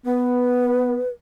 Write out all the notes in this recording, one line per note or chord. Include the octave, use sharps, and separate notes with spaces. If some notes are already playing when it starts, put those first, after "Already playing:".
B3 B4